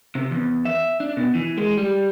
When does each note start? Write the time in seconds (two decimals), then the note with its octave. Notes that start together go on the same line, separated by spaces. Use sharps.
0.15 C3
0.31 E2
0.65 E5
1.00 D4
1.17 B2
1.35 E3
1.58 G#3
1.77 G3